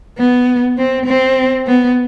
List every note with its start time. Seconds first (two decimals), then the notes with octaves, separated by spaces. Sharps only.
0.18 B3
0.78 C4
1.06 C4
1.67 B3